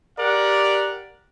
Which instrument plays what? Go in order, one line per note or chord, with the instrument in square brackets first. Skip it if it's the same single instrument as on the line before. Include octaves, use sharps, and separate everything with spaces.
[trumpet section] G4 A#4 D5 F#5